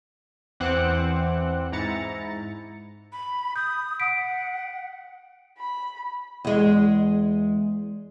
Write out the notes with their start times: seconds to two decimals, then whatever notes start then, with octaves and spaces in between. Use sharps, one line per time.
0.60 E2 E3 C4 F#5 D6 F#6
1.72 G#2 E4 A#5 A6 C#7
3.12 B5
3.56 D#6 G6
4.00 F#5 B6 D7
5.58 B5
6.45 E2 G#3